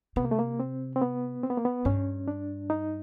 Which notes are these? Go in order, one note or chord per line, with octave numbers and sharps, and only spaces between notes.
C3 B3
A#3
A3
A#3
C4
C4
B3
C4
B3
A#3
B3
G2 C#4
D4
D#4